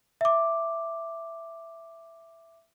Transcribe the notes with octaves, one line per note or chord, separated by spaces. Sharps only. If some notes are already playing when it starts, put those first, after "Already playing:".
E5 D6